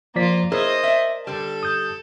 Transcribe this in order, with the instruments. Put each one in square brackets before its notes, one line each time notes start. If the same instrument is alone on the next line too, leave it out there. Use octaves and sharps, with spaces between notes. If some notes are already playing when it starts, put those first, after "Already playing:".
[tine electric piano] F3 D5 B6 [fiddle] A#3 F4
[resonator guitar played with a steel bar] E4 G#4 C#5 [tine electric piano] A#4 [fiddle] C5 D#5
[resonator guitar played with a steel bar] D5 E5
[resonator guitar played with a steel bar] D3 G3 [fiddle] A4
[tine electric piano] D#6 G6